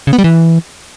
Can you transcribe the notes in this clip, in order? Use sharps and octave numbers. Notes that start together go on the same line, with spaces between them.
C#3
B3
G3
E3